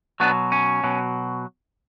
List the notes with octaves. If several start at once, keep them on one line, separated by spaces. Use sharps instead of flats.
B2 F#3 B3 D4
C#4
B2 F#3